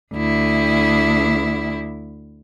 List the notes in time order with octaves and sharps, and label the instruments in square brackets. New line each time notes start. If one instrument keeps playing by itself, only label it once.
[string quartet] D2 E4